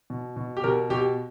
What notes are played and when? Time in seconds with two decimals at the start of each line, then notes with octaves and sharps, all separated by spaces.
0.10 B2
0.36 B2
0.57 G4
0.64 B2 A#4
0.90 B2 G4